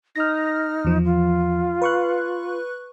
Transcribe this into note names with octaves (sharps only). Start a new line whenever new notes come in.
D#4 F6 A#6
E2 F3
F4
B4 C#6 F#6